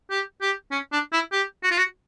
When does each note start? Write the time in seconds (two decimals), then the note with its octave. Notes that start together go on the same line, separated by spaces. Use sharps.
0.11 G4
0.41 G4
0.71 C#4
0.92 D4
1.13 E4
1.32 G4
1.63 F#4
1.71 F4
1.78 F#4